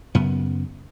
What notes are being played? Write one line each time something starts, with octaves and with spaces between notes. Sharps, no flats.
F#2 C#3 B3